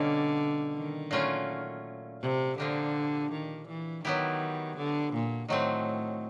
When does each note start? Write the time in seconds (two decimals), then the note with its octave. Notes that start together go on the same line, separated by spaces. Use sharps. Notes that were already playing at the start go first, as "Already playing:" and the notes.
Already playing: B2 D3 G3 A#3 C#4
0.76 D#3
1.11 A#2 F#3 A3 C#4 F4
2.22 C3
2.58 A#2 D3 F3 A#3 D4 G4
3.31 D#3
3.68 E3
4.04 D#3 F#3 B3 E4 G4
4.77 D3
5.14 A#2
5.49 A2 D#3 F#3 A3 C4